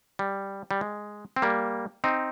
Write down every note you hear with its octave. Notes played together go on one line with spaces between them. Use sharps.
G3
G3
G#3
C4
G3 A#3
C4 D#4